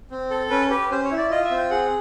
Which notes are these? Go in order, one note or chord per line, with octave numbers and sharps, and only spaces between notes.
C4
A4
C#4 B4
G4 B4
C#4 C5
C#5
E4
D5
F4 D#5
E5
C4
G5
G#4 F#5